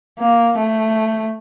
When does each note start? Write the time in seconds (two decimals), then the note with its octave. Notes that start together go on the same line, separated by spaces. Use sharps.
0.19 A#3
0.57 A3